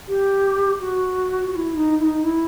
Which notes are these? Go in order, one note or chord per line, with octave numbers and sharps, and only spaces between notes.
G4
F#4
F#4
E4
D#4
E4
D#4
E4